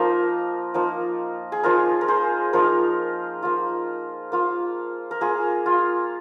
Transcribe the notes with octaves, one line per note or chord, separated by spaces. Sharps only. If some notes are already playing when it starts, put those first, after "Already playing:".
Already playing: F3 A#3 D#4 F4 A#4
F3 A#3 D#4
G#4
F3 A#3 D#4 F4 A#4
A#4
G#4 C5
F3 A#3 D#4 F4 A#4
A#3 F4
A#3 F4
A#4
A#3 F4 G#4
F4